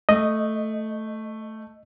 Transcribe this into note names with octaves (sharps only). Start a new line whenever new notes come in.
A3 D#5